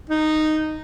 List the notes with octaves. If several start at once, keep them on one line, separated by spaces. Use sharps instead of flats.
D#4